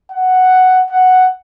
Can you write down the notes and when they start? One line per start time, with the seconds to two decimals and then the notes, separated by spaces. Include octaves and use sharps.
0.11 F#5
0.90 F#5